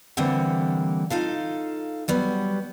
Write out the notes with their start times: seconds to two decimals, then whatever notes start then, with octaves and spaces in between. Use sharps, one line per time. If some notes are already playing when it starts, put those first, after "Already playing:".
0.17 D3 E3 G3 A#3 C4 F#5
1.10 D#4 F4 A4 F5
2.08 F#3 G3 B3